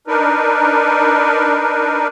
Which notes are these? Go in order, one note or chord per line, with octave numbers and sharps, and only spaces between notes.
D4 D#4 A#4 B4